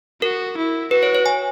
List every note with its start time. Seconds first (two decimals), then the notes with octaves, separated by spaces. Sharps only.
0.22 F#4 A#4
0.57 E4
0.91 F#4 B4
1.03 C#5
1.15 C#5
1.26 G#5